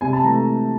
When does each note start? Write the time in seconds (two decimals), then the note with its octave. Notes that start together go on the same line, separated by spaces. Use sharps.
0.01 C3 G#5
0.13 A5
0.24 E3 A3 A#5